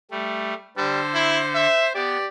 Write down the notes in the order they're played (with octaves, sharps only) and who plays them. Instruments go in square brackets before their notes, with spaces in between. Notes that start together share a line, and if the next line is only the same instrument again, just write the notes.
[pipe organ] G3 A3
[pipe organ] D3 A4 [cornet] G3 [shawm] C5
[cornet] E4
E5
[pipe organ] B3 [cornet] G4 [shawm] D5